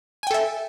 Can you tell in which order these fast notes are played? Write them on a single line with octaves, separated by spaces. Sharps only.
G#5 G5 A4 E5